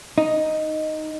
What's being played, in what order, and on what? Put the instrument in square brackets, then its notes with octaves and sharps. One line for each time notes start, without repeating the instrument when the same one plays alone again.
[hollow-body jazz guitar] D#4